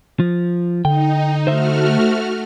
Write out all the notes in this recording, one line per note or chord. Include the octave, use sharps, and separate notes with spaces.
F3
D3 D#4 G5
A3 F#4 C5 E5 F6